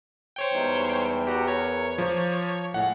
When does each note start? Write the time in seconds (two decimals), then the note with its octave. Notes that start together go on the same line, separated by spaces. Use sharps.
0.36 C5 C#5 G5
0.53 E2 G3 G#3 D#4
1.27 F#4 G4 A#4 F#5
1.48 C#5
1.98 F3 D5 A#5
2.74 A2 G#3 G#4 F5 F#5